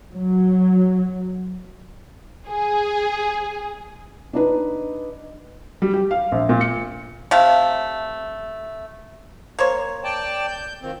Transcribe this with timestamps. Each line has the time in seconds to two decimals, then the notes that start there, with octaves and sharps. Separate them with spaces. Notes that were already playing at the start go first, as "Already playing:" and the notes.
0.12 F#3
2.47 G#4
4.33 D4 D#4 B4
5.82 G3
5.94 G4
6.11 F5
6.32 A#1
6.49 A#2
6.61 C#7
7.31 C3 A3 F5
9.59 A#3 C5 C#5
10.04 D5 G5 A5
10.47 G6
10.82 D#3 F3 C4